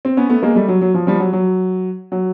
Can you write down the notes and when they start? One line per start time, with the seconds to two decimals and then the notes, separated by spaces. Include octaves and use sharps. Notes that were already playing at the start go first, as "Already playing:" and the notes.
0.05 C4
0.17 B3 C#4
0.29 A3 B3
0.42 G#3 A#3
0.55 G3 A3
0.68 F#3
0.81 F#3
0.94 F3
1.07 F3 G3
1.20 F#3
1.33 F#3
2.12 F#3